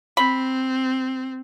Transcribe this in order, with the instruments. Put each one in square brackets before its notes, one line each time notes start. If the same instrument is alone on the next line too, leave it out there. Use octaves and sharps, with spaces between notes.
[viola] C4 [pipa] B5